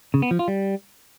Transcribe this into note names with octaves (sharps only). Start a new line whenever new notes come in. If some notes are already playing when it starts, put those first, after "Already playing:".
C#3
B3
F3
F4
G3